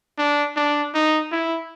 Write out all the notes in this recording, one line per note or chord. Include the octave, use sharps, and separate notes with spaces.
D4
D4
D#4
E4